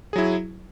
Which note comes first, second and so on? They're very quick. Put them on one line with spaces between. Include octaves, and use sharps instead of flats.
G#4 F#3 E4